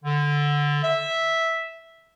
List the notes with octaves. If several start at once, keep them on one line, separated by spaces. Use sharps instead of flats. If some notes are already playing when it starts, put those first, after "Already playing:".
D3
E5